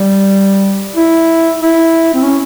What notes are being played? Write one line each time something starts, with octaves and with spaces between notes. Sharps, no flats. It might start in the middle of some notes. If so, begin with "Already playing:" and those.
Already playing: G3
E4
E4
C4
C#4